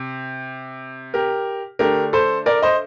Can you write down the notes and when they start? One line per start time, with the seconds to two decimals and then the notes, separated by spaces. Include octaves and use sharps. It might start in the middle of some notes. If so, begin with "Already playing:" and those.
Already playing: C3
1.14 G4 A#4
1.79 D3 A3 D4 G4 A#4
2.13 A4 C5
2.46 A#4 D5
2.62 C5 D#5